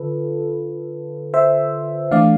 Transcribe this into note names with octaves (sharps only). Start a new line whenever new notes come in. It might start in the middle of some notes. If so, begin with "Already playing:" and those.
Already playing: D3 F4 A4 B4
C5 E5
E3 A3 D4 D5 F5